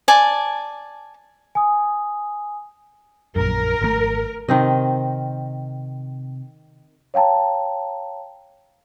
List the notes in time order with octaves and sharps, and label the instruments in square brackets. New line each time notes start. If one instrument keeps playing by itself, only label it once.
[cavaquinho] D5 G#5 A5
[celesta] G#5 D#6
[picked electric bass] A#1 F#2 [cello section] A#4
[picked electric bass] G#1 C3 A3
[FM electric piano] C3 [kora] D#3 C4 D#5
[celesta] C#5 F5 G5 A5 A#5